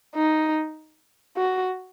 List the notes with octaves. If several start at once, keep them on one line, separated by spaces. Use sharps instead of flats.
D#4
F#4